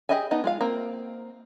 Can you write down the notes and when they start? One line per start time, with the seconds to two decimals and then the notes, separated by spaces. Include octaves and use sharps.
0.09 G4 G#4 D#5 E5 G#5
0.31 B3 D#4 D#5 A5
0.44 G#3 F4 F5
0.61 A#3 C4